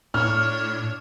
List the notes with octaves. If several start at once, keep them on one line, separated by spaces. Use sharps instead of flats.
A2 D4 C#5 F6